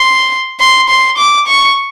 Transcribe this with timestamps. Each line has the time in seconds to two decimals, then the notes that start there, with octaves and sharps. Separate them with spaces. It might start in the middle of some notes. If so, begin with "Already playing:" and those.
Already playing: C6
0.60 C6
0.89 C6
1.18 D6
1.47 C#6